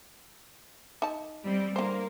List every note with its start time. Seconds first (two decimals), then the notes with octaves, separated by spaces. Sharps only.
1.02 D#4 A5
1.44 G3 C4
1.76 D3 A#3 C5